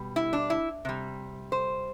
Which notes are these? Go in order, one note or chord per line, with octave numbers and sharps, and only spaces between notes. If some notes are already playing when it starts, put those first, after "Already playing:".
Already playing: B2 G3
E4
D4
E4
C3 G3
C5